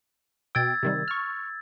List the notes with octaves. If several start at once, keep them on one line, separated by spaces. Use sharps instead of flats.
B2 G5 E6 G#6 A6
C3 D#3 G3
C#6 F6